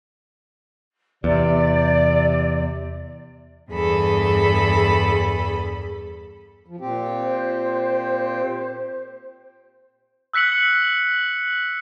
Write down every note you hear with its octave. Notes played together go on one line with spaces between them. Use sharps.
E2 C3 D5
E2 G2 G#4 A4 B5
F3
A#2 C4 G4
C5
E6 F#6 B6 C#7 F#7